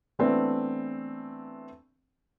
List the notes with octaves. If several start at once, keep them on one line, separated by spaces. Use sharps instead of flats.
E3 A3 B3 C4 D4